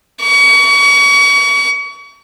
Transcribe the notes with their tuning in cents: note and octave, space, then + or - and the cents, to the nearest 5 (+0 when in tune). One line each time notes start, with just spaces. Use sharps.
C#6 +35